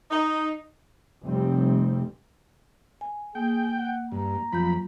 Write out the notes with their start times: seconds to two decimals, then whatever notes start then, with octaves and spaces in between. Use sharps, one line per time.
0.11 D#4
1.25 F1 G3 C4
3.01 G#5
3.35 A#3 G#4 G5
3.77 F#5
4.12 G2 A#5
4.52 F2 F#3 F4 B5 G6